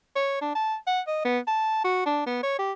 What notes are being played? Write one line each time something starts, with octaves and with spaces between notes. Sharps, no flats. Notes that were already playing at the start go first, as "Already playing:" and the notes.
C#5
D4
A5
F#5
D#5
B3
A5
F#4
D4
B3
C#5
G4